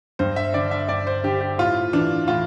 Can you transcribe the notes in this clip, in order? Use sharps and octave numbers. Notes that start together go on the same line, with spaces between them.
G2 C5
E5
D3 D5
E5
G2 D5
C5
D3 G4
G4
A2 F4
E3 D4
A2 F4